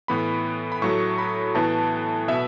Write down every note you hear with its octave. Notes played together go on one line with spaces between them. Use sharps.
A2 E3 B3 B5
B5
A2 F#3 A3 C#6
B5
A2 E3 B3 A5
B2 B3 E5